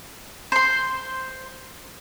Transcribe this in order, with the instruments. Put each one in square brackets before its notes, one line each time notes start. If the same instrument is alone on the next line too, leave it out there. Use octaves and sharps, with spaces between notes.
[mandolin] C5 C6